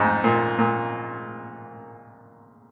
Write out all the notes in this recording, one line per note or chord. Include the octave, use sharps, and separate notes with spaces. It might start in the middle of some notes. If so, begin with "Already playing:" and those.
Already playing: F2 G#2
A#2
A#2